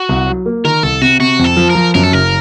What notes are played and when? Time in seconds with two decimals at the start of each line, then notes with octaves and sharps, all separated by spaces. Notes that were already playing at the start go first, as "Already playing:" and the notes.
Already playing: F#4
0.09 C2
0.27 F#3
0.46 A#3
0.64 D#3 A#4
0.83 C2 A4
1.02 C3 F#4
1.19 C3 F#4
1.39 F2
1.45 A4
1.57 F3
1.70 A#4
1.75 F3
1.94 F#2 A#4
2.03 A4
2.12 F#1 A#4